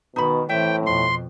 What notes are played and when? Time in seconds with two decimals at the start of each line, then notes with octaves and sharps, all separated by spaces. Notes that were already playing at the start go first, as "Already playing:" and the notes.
0.16 B2 D#3 D#4 B5
0.49 A2 E3 C4 E5 G5
0.87 F2 B2 C6